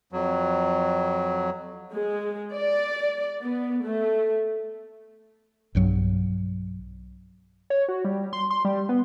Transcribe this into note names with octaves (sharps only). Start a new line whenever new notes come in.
F2 F#3
G#3
D5
B3
A3
B1 G2 F#3
C#5
F#4
G3
C6
C6
G3
B3